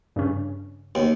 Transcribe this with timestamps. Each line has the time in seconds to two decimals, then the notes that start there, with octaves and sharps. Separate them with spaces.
0.16 G2 C#3 C#4
0.95 D#2